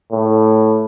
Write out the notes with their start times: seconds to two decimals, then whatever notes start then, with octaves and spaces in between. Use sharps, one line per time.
0.12 A2